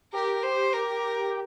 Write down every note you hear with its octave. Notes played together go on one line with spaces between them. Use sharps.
G4 A#4
C5
A#4